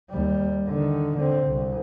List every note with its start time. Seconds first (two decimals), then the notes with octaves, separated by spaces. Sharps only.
0.10 D#2 G3
0.67 D3 D#3
1.17 D3 C4
1.47 C2